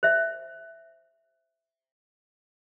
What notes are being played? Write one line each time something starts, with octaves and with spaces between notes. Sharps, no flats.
C5 E5